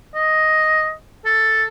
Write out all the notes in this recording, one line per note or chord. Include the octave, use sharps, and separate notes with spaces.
D#5
A4